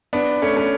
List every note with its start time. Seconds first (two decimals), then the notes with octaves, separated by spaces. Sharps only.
0.13 B3 D4
0.42 A3 C#4
0.57 A3 C#4